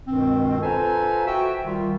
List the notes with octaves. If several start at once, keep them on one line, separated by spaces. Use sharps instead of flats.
C#2 G2 B2 D#3 C4
F4 A4 B4 C5 G#5 A#5
F#4 E5 G5
D#3 G3 F4